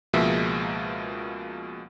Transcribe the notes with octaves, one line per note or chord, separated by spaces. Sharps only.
C#2 B2 F3 G#3 A#3 E5